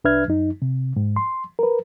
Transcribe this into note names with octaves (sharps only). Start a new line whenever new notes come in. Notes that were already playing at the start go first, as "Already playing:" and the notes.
C2 D4 B4 E5 F6 G#6
F#2 D#4
C3
G#2
C6
A#4 B4